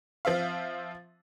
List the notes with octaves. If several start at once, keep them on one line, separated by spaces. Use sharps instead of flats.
F3 C4 E5 F5